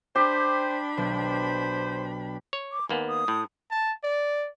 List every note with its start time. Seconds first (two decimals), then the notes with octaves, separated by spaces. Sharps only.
0.15 D4 G4 C5 B5
0.97 B1 C5
2.53 C#5
2.72 D6
2.89 D#2 A#3 B3 G#5
3.08 D#6
3.28 A2
3.71 A5
4.03 D5